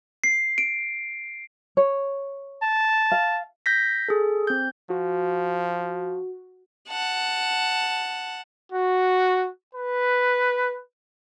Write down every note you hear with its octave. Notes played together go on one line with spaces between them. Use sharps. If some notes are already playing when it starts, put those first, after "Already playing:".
C7
D7
C#5
A5
F5
G6 A#6 B6
G#4 A4
C4 G6
F3 F#4
F#5 A5
F#4
B4